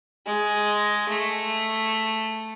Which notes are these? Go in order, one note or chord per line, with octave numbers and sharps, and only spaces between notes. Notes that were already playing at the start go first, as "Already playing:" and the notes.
G#3
A3